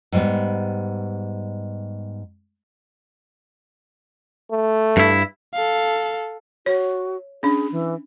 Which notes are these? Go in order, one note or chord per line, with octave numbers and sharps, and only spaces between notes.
G#2 G3 B3
A3
G2 E4
A4 F5
F#4 C#5
C#4 D4 G#4
E3